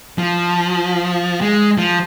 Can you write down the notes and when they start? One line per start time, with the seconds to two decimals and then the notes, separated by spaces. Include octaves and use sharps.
0.18 F3
1.41 G#3
1.78 F3